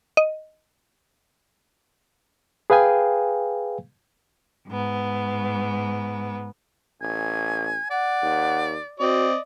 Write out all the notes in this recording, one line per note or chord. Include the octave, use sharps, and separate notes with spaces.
D#5
G#4 B4 F5 G5 G#5
G#2 B3
A1 G#5
D5 F#5
D#2
C4 F#4 D5 D#5